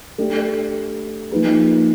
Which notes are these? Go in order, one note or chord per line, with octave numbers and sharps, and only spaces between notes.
A3 D4 G4
F3 A#3 D#4 G#4 B4